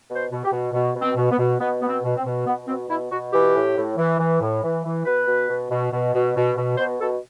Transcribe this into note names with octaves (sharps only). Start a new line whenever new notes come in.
B2
C5
B2
G4
B2
B2
B2
C4
B2
B3
B2
B2 B3
B2 B3
C4
B2
C4
B2
B2 B3
B2 C4
B2 E4
B2 F#4
E3 G4
A2
A2
E3
E3
A2
E3
E3
B2 B4
B2
B2
B2
B2
B2
B2
B2
B2 C5
B2 A4